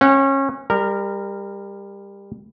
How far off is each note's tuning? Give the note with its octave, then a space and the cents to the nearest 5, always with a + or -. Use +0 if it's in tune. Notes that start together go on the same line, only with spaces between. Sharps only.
C#4 -25 F#5 +30
G3 +25 A#4 -15